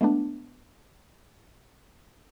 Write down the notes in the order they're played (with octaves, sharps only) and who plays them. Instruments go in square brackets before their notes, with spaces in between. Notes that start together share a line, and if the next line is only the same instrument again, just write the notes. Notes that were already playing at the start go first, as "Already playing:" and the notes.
[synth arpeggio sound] G#3 A3 B3 D4